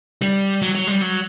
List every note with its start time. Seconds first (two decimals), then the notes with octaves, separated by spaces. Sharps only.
0.22 G3
0.62 F#3
0.75 F#3
0.87 G3
1.02 F#3